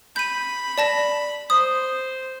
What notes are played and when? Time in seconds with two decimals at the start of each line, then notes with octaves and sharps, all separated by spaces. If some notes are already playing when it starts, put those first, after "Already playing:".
0.16 B5 G6 D#7
0.78 D5 A5 A#6
1.50 C5 D#6